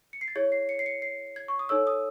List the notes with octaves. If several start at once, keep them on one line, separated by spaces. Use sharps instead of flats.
C#7
C7
A6
E4 G#4 C#5 G#6
C7
C#7
C7
C#7
C7
G#6
C#6
D#6
D#4 A4 C#5 E6
D#6